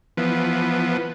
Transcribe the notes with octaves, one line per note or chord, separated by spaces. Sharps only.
E3 F3 B3